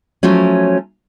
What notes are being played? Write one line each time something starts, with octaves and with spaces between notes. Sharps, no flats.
F3 F#3 A3 C#4